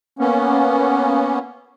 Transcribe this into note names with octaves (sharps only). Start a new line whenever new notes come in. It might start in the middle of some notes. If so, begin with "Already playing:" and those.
A#3 B3 C#4